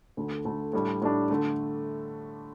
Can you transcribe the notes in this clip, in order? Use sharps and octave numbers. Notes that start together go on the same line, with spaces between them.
D2 D3 A3
D2 D3 A3
A2 G3 D4
A2 G3 D4
D3 A3